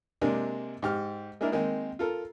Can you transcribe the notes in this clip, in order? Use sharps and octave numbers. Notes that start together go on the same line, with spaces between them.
C3 G#3 A#3 C4 D4
G#2 G4 F6
G#3 A#3 D4 E4 A#4
D#3 G#3 A#3 C4
F4 A4 A#4